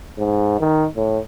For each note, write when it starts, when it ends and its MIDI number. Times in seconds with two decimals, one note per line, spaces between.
0.18 0.60 44
0.60 0.86 51
0.96 1.18 45